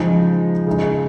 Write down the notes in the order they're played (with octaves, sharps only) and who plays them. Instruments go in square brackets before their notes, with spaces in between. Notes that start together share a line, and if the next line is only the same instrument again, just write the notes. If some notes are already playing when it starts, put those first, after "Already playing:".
Already playing: [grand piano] C#3 F3 G#3 D#4
C#3 G#3 D#4